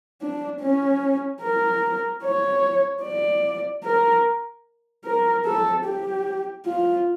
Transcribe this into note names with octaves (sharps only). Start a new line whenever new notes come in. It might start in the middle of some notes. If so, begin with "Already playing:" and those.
D4
C#4
A#4
C#5
D5
A#4
A#4
A4
G4
F4